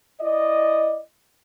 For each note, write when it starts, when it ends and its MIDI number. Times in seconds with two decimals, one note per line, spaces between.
0.21 0.98 64
0.21 0.98 74
0.21 0.98 75